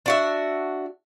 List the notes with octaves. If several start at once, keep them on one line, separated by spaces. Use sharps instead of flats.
D4 F#4 E5